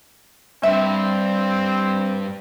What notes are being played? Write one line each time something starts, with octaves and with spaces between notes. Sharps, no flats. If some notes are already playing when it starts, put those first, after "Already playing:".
G2 C4 E5